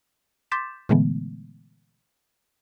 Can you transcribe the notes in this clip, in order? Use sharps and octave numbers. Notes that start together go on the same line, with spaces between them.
C6 D6 G6 A6 B6 E7
A#2 D3 E3 G#3 A3 B3